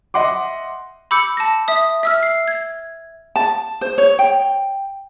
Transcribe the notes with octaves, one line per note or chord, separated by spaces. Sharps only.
D#5 E5 F#5 C6 D6
B5 D6 E6 G6 C#7
A5 A#6
E5 D#6
E5 E6 F6
C7
G#6
A5
C5
C#5
G5